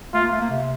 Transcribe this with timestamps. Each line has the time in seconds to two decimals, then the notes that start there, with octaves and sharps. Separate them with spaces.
0.14 A3 F4
0.23 A#3
0.31 A3
0.41 A#3
0.50 C3